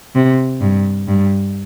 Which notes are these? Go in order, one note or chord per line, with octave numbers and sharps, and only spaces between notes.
C3
G2
G2